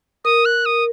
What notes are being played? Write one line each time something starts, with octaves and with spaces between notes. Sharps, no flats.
A#4 D#6
F#6
D#6